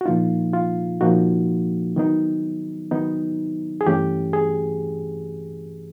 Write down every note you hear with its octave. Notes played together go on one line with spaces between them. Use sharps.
F#4
A#2 F3 A#3 D#4 F4
F4
A#2 F3 A#3 D#4 F#4
D#3 F#3 B3 D#4
D#3 F#3 B3 D#4
G#4
G2 E3 A3 C#4 G4
G#4